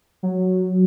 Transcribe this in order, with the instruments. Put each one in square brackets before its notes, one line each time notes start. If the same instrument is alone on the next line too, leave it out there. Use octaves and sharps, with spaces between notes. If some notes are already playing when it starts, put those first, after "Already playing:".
[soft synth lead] F#3